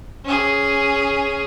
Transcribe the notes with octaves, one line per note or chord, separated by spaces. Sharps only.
C#4 G#4